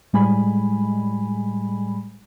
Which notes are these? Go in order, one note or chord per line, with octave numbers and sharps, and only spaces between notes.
A2 G3 G#3 G#5 B5